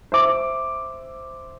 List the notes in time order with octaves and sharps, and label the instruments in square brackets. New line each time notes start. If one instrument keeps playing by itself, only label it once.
[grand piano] C5 E5 D6